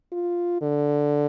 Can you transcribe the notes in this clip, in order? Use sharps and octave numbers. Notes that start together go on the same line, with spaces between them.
F4
D3